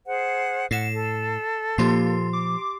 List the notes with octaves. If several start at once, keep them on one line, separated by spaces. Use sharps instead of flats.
G#4 C5 F#5
A2 F#5 C7 E7
A4
A#2 F3 A#3 G4 C6 C7
D6